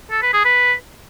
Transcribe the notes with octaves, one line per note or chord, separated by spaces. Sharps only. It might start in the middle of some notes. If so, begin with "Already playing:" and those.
A4
B4
G#4
B4